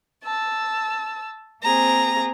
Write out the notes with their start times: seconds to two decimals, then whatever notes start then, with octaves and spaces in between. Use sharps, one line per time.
0.24 A5 E6
1.63 A#3 C4 G#4 A#5